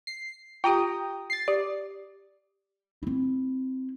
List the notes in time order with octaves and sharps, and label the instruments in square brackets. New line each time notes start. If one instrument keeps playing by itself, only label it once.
[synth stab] C7
[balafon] F4 G4 [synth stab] G5 A#5 D#6
[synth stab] A6 C7
[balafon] G4 [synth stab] D5
[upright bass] C4 E4